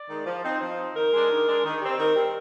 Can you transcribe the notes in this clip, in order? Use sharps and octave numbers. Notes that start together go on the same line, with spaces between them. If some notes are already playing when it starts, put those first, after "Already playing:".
Already playing: D5
D#3 G#3
F3
C4 D#4
F3 C5
C4 D#4
D#3 A#4
G#3 D4
D#3
G#3 D4
D#3
G3 C4
D#3 A#4
G3 C4